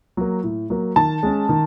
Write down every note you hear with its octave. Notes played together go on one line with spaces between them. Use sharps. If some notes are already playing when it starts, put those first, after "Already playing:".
F#3 A#3
A2
F#3 A#3
D#3 A5
G#3 C#4
D#3